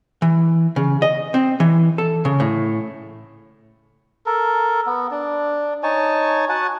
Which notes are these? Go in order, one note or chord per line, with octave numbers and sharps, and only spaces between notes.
E3
C#3
D#5
C4
E3
A4
C#3
A2
A4 A#4
B3
D4
D#4 C#5 G#5 A5
F#4 F#5 G#5 A5